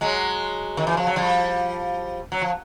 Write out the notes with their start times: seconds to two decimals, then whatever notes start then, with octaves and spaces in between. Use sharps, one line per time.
0.01 F#3 G#3
0.77 D#3
0.87 E3
0.97 F3
1.07 F#3
1.16 F3 G3
2.32 F#3
2.42 F3